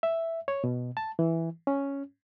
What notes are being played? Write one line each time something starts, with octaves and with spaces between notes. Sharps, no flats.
E5
C#5
B2
A5
E3
C#4